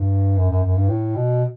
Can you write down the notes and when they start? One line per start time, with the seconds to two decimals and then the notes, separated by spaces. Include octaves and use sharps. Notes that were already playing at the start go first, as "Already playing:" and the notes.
Already playing: G2
0.37 F#2
0.51 F#2
0.64 F#2
0.76 G2
0.89 A2
1.15 B2